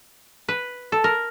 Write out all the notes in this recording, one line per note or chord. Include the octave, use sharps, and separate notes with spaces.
B4
A4
A#4